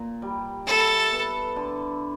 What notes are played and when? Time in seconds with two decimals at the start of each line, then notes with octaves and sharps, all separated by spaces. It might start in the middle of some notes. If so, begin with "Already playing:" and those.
Already playing: A#2
0.22 G3
0.67 E4 A4
1.12 B3
1.56 D3